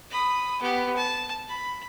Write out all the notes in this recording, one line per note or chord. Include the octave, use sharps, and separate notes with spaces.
B5 D#6
B3 G4
A5
B5